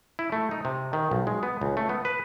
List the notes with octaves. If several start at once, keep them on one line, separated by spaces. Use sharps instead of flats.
E4
A3
D#4
C3
D#3
B1
G#3
B3
C#2
A3
B3
B4